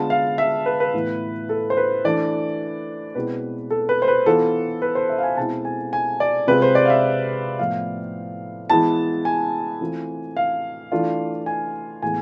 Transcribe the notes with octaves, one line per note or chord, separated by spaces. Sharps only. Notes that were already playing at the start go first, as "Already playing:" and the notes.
Already playing: D3 G#3 B3 F4 A5
F5
E5
B4
B4
A2 E3 B3 E4
A4
C5
B4
E3 A3 D4 D5
B2 G#3 C4 E4 B4
A4
B4
C5
B4
E3 B3 F4 A4
B4
C5
E5
F5
G#5
B2 G#3 C4 E4 A5
G#5
G#5
D5
C3 G#3 C4 F4 B4
C5
D5
F5
E5
A2 F3 B3 F5
E3 G#3 B3 E4 A5
G#5
E3 A3 C4 F4
F5
E3 A3 D4 F4
G#5
A2 E3 G#3 B3 G#5